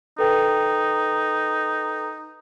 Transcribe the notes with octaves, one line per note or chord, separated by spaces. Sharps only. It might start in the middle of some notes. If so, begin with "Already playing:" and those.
D#4 A4 B4 G5